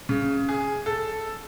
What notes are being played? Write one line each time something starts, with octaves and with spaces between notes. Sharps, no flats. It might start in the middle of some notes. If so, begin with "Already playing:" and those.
C#3
G#4
A4